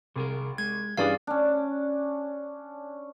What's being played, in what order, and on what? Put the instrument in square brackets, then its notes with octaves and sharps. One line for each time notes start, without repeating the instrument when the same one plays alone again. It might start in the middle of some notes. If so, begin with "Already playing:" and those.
[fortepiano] C2 [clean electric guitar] C3 G#4 A#4
[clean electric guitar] G#3 [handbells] G#6
[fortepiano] G2 E3 G3 [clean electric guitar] C#4 D4 [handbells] G#4 D5 F5
[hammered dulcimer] C#4 D4